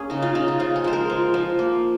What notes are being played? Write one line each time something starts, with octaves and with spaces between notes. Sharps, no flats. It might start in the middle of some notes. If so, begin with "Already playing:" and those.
Already playing: A#3 C#4 G#4
C#3 D#4
F4
C#3 D#4
F4
F3 F4
G#4
G#3 C5
A#4
F3
F3
A#3